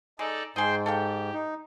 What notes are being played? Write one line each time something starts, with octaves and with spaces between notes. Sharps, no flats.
G#3 D#4 A4 D5
G#2 G#4 C5 D#5 G5 C6
G4 A4 F5 G5
D#4